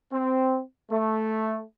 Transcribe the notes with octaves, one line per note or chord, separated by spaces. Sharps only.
C4
A3